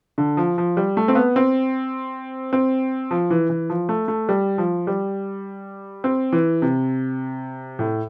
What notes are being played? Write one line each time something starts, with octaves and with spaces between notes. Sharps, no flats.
D3
F3
F3
G3
A3
C4
B3
C4
C4
F3
E3
E3
F3
A3
A3
G3
F3
G3
C4
E3
C3
A2